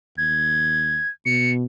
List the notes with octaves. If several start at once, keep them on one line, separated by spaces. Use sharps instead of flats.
D#2 G#6
B2 C#7